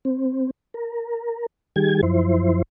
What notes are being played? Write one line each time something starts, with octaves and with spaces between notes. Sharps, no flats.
C4
A#4
D#3 G3 G4 G#4 G#6
F#2 F3 E4 C5